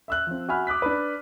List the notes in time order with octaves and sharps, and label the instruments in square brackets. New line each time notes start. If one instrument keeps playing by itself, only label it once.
[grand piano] E5 E6 F#6
F3 C4
F#4 E5 G#5 B5 F6
D6 D#6 F#6 B6
D4 B4